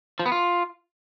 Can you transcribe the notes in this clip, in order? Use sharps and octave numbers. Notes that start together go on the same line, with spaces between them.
F3
B3
F4